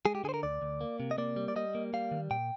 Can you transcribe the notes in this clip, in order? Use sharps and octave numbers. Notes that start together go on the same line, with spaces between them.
G#3 G#4
G4
D3 G#4 C5
A#4
D2 D5
D2
A#3
C3
D#5
A#3 D5
G3
D5
G3 D#5
A#3
G3 F5
D#3
A#2 G5